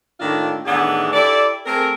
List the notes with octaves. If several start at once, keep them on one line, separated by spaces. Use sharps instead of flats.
A2 D#3 A3 A#3 D4 F4
A2 D#3 E3 B3 D4 G#4
E4 G4 A4 D5
A3 C4 G#4 A#4